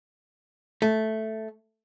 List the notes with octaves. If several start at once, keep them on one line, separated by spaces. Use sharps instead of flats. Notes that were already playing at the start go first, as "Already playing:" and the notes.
A3